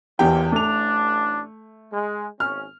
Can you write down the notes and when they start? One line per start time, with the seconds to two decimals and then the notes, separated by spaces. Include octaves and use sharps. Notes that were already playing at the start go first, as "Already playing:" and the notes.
0.19 G#1 E2 A#2 A#3 G4 G5
0.52 A1 A3 D4 F7
1.92 G#3
2.40 G#1 C#4 F6